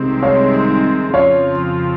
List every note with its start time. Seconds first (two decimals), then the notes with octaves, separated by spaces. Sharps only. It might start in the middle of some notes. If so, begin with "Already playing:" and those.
Already playing: C2 C3 D#3 G#3 C4
0.23 C#5 F5
1.13 F2 C#3 F3 C4 F4 C#5 F5